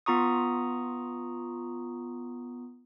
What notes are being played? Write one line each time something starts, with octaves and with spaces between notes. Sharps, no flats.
B3 F4 A#5 C#6 D#6